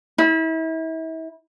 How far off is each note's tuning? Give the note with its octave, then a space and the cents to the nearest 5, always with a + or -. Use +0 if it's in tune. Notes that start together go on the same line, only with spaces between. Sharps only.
E4 -35